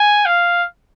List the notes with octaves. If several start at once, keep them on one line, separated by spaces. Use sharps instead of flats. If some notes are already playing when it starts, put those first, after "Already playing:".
Already playing: G#5
F5